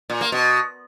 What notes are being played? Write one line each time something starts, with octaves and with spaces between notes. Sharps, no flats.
A#2
A#3
B2